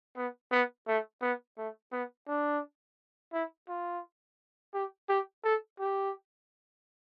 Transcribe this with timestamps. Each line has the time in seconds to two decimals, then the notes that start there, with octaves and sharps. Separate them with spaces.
0.16 B3
0.51 B3
0.87 A3
1.22 B3
1.58 A3
1.92 B3
2.28 D4
3.33 E4
3.69 F4
4.74 G4
5.09 G4
5.44 A4
5.80 G4